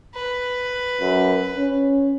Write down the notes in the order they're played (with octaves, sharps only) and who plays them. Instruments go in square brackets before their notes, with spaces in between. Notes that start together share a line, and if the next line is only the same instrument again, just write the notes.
[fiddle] B4
[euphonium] F#2
C#4